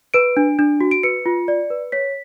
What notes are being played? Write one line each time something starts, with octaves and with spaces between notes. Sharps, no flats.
B4 D7
D4
D4
F#4
D7
B4 C#7
F4
D5
B4
C#5 B6